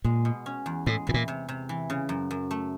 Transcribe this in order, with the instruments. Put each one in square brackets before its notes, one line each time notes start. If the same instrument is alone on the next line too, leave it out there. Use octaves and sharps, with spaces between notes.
[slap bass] A#2 [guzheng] G#3
[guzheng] B2
C#4
E2
[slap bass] A2 [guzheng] G#3
[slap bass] A2 [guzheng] E3
[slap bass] A#2
[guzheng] C3
C3
E3
C#3
F#2
F#2
A3